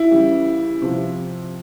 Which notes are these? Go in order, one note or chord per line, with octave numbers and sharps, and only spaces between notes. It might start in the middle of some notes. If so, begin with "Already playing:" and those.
Already playing: E4
C#3 E3 G3
C3 F3